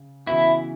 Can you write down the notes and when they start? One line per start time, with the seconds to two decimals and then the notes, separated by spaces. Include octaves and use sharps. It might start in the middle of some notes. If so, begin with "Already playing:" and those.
Already playing: C#3
0.26 C#3 E3 B3 E4 F#4